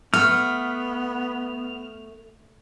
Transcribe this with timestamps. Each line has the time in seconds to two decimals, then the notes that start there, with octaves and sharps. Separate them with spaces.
0.14 A3 B3 F6